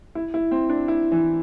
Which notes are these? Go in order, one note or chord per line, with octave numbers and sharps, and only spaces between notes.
E4
E4
C4
D4
E4
E3